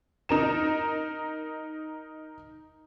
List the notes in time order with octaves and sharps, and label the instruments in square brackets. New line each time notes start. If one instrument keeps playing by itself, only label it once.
[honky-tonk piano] D#4 A#4 E7